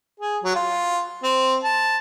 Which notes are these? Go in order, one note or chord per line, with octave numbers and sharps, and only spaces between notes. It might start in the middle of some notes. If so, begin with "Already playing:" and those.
G#4
F#3
F4
C4
A5